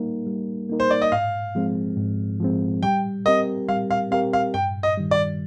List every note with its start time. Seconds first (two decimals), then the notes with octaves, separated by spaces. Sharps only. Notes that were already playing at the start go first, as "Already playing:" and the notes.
Already playing: G3 A#3 D#4 A#4
0.26 G3
0.69 A#3 D#4 A#4
0.80 C5
0.91 D5
1.02 D#5
1.12 G#2 F5
1.55 F3 G#3 C4
1.97 G#2
2.40 F3 G#3 C4
2.83 G3 G5
3.26 C4 G4 A#4 D#5
3.69 G3 F5
3.91 F5
4.11 C4 G4 A#4 F5
4.33 F5
4.54 G2 G5
4.83 D#5
4.97 D#3 G3
5.11 D5